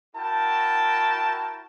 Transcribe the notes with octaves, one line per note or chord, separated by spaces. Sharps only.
E4 F#4 A#4 G5 A5